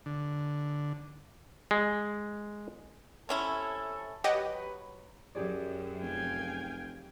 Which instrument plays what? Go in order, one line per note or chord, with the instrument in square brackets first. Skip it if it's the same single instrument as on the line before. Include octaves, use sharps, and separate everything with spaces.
[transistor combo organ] D3
[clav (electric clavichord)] G#3
[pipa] C3 C#4 E4 [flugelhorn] A4
[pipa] F#3 [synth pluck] G4 D#5 F#5 [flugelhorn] B4
[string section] F#2 [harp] G4 G#4 D5
[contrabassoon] F1 [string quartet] F5 G5 G#5